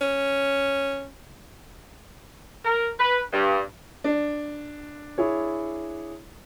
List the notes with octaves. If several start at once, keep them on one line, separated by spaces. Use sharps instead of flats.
C#4
A#4
B4
G2
D4
E4 G#4 C#5